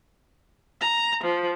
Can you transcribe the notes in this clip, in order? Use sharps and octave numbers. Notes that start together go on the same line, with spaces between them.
A#5
F3